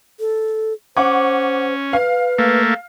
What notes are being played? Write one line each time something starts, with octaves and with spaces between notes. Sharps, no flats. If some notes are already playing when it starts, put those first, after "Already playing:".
A4
C#4 C5 F#5 C#6 D6
B4 F5
A3 A#3